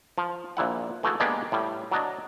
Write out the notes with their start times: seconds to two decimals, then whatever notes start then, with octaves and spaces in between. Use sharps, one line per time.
0.18 F3
0.57 A#1 A#2 E4 F#5
1.03 E3 A3 F#4 G#4
1.20 G#3 A#3 B3 D4 G4
1.52 A2 G3
1.92 F#3 D4 D#5